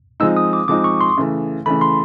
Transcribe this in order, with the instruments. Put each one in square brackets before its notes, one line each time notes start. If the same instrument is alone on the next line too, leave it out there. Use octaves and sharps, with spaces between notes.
[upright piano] F3 G#3 C4 D#4 [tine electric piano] E6
[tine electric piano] D#6
D6
[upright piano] F3 G#3 C4 D#4 [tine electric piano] D6
[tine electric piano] C#6
C6
[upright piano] C#3 E3 A3
[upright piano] C#3 E3 A3 [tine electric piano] B5
[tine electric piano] C6